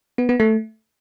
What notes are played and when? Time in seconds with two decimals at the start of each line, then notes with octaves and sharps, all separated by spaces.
0.18 B3
0.29 B3
0.40 A3